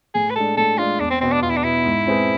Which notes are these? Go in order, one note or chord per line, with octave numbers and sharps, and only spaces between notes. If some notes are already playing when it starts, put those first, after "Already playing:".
A2 G#4
B4
G#3 D4 A4
A2 A4
G#3 D4 F4
E2 D4
C4
B2 B3 C4
D4
E2 F4
E4
D4
B2 B3 E4
G#2
G#3 C4 G#4 B4